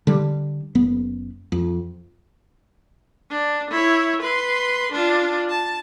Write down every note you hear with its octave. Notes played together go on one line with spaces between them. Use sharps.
D3 G3
F#1 B3
F2
D4
E4 C#5
B4 C6
D4 F4
A5